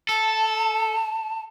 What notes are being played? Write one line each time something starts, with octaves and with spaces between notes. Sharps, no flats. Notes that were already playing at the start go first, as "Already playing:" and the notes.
A4 A5